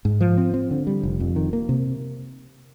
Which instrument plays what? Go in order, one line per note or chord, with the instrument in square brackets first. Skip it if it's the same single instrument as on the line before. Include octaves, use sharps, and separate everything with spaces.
[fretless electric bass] G#2
F3
C4
C4
D3
G3
F1
F2
D#3
A#3
C3